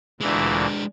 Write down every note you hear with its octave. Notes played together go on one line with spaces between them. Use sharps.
D2 A#2 E3 G#3 D4